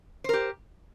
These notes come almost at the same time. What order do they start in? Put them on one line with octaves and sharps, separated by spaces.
C5 A#4 G4